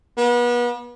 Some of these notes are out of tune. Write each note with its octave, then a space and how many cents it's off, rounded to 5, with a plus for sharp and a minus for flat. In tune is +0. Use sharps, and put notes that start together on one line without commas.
B3 -35